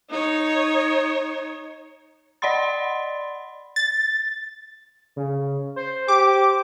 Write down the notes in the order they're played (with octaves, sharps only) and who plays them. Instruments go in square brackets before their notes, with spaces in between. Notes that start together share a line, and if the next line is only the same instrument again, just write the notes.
[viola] D#4 C#5
[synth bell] D5 D#5 F#5 B5 C6 A6
[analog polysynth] A6
[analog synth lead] C#3
C5
[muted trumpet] G4 [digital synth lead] D6